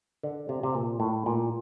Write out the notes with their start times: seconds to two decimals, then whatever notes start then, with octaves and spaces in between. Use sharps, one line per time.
0.23 D3
0.49 C3
0.63 C3
0.74 A#2
1.00 A2
1.26 A#2